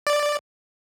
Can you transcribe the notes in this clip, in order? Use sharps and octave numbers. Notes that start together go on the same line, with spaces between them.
D5